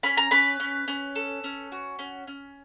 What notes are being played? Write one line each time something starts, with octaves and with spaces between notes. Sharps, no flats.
C#4 B5
A#5
C#4 B4 B5
C#4
C#4
A4
C#4
F#4
C#4
C#4